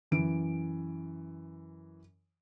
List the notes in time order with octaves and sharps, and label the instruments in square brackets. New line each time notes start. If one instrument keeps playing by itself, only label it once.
[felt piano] F#2 E3 D7